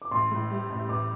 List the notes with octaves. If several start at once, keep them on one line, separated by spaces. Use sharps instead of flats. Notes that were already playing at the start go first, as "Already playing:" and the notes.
D6
A1 C6
A2
G3
A1
A1 D6